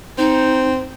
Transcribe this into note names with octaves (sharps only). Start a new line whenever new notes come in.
C4 D#4